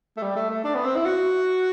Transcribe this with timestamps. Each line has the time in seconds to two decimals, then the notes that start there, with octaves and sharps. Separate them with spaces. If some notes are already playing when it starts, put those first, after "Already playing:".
0.17 A3
0.22 G3
0.36 A3
0.50 A3
0.64 D4
0.75 B3
0.85 C4
0.95 E4
1.05 F#4